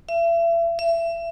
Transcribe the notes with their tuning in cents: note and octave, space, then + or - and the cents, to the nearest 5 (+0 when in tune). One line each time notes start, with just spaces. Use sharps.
E5 +35
E5 +25